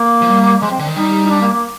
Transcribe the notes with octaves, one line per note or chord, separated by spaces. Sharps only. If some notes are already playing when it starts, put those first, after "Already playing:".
Already playing: A#3
F3
G3
F3 G#3
C4
D3
D#3
G3 D#4
D#4
D4
A#3
A#3